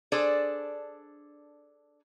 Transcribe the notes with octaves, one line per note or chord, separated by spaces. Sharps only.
D4 G#4 A4 C5 D5